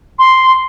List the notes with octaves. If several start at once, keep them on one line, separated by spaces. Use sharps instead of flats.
C6